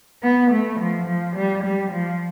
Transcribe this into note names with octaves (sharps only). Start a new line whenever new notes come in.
B3
A3
F3
F3
G3
G3
F3